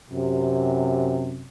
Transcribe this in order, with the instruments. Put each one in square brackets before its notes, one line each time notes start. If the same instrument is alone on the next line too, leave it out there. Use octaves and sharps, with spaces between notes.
[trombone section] F#2 C3